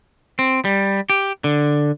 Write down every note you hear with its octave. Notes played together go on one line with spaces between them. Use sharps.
C4
G3
G4
D3